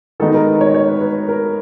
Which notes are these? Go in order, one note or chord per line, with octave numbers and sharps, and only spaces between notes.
D#3 G#3 B3 D#4 A4
A#4
C#5
C#5
B4
B4
A#4